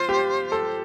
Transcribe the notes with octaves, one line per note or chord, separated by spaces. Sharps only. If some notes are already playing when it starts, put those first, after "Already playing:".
Already playing: F4 C5
G4
A4